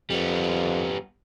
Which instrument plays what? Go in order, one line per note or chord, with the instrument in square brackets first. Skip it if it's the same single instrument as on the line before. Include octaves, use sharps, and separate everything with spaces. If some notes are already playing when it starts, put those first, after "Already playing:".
[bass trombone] F2 [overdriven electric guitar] G3 B3